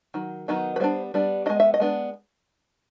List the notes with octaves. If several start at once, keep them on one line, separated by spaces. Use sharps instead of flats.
D#3 F#3
D#3 F#3 B3 D#4
B4
G3 B3 D4 C5
G3 B3 D4
G#3 B3 D4 D#5
E5
D#5
G#3 B3 D4